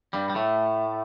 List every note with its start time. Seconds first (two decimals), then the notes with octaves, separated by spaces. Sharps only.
0.13 G2 G3
0.30 G3
0.35 A2 A3